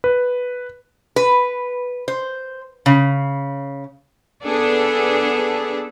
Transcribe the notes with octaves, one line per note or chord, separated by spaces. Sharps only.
B4
B4
C5
C#3
B3 D4 G#4 A4